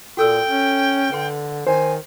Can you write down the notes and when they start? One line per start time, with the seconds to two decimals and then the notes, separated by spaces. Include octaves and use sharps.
0.17 A#2 F#4 A4 G5 E6
0.47 C#4
1.12 D3 B4 F#5 C6
1.67 D#3 C5 G#5